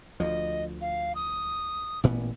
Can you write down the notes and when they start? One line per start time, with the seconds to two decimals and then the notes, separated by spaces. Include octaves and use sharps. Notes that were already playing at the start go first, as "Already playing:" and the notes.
0.20 D2 F3 D#5
0.81 F5
1.15 D#6
2.04 A1 A#2 B3